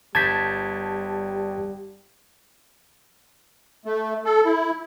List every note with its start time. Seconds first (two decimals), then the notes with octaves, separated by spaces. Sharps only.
0.15 G1 G3 A5 G6 G#6 B6
3.85 A3
4.25 A4
4.45 E4